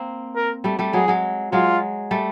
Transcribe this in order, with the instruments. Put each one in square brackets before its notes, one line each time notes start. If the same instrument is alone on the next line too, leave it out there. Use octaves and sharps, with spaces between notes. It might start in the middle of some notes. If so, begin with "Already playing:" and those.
Already playing: [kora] A#3 C4
[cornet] A#4
[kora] G3 A3
G3 A3
[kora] F#3 G#3 [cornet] G#4
[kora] F#3 G#3
[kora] F#3 G#3 [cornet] F4
[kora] G3 A3